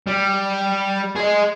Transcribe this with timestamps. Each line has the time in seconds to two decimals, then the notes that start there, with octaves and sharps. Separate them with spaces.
0.07 G3
1.16 G#4 D#5